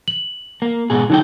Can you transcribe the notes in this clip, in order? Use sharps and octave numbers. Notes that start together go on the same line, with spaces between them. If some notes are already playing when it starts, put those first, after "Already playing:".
F#7
A#3
G#2 B2 G#4
D3 F#3 D#4 G5